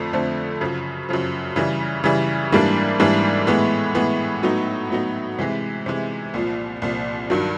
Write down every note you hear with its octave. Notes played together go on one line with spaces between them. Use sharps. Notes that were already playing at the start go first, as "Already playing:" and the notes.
Already playing: F2 D3 F3 A3 C4
F2 D3 F3 A3 C4
F#2 C#3 F3
F#2 C#3 F3
C#3 E3 G3
C#3 E3 G3
G#2 E3 G3 A#3 D4
G#2 E3 G3 A#3 D4
A2 E3 G#3 B3
A2 E3 G#3 B3
A2 F#3 B3 D#4
A2 F#3 B3 D#4
C3 E3 G#3
C3 E3 G#3
C2 A#2 F3
C2 A#2 F3
G2 D#3 F#3